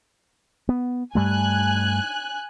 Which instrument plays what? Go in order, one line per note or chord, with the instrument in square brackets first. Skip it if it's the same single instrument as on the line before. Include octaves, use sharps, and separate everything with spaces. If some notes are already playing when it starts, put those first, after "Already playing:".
[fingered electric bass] B3
[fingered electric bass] G2 G3 A3 [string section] G#5 F#6